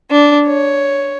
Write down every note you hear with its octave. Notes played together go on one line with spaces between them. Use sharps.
D4
C#5